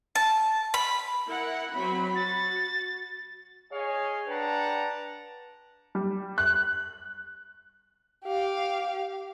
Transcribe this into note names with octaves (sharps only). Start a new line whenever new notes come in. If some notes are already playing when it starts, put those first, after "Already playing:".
A5
B5
E4 A#4 F#5
F#3 C4 B5
F#4 A6
G#4 C#5 D#5 F5 G#5
D4 B4 F#5 G5 A5 A#5
G3
F#6
G4 F5